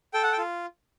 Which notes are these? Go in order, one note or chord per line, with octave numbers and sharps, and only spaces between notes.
A4 G5
F#5
G5
F4